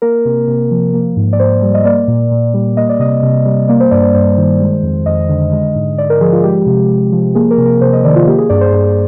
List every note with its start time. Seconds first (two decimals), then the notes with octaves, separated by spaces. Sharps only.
0.02 A#3 A#4
0.25 C3
0.48 C3
0.71 F3
0.94 A#3
1.17 G#2
1.33 D5
1.39 G#2 C5
1.62 G3
1.74 D#5
1.85 A#3 D5
2.08 A#2
2.32 A#2
2.54 G3
2.77 A#3 D#5
2.89 D5
2.99 C3 D#5
3.23 C3
3.46 G3
3.69 A#3 D5
3.80 C5
3.91 G2 D5
4.03 C5
4.14 G2 C5
4.38 D#3
4.60 G#3
4.83 F2
5.06 F2 D#5
5.29 D3
5.53 G#3
5.75 G#2
5.98 G#2 D5
6.10 A#4
6.21 F3 G#4
6.33 F4
6.44 G#3 G4
6.66 C3
6.89 C3
7.12 F3
7.35 A#3 G#4
7.51 A#4
7.58 C3
7.66 A#4
7.81 C3 C5
7.93 D#5
8.04 D#3 D5
8.16 F4
8.27 A#3 G4
8.38 G#4
8.49 G2 D5
8.61 C5
8.73 G2 C5